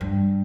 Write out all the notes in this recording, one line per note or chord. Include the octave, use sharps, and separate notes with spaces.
G2